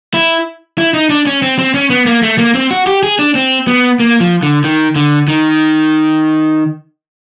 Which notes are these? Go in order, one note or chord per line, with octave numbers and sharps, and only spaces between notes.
E4
E4
D#4
D4
C#4
C4
C4
C#4
B3
A#3
A3
A#3
C4
F#4
G4
G#4
D4
C4
B3
A#3
F3
D3
D#3
D3
D#3